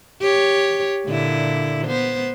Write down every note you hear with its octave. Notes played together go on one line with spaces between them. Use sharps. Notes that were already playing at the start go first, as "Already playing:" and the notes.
G4 C#5
A#2 D3 E4
B3 C5